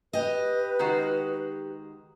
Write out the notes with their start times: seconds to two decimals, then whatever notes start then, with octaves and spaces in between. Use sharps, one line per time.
0.13 G4 B4 D#5
0.79 D#3 G#3 F#4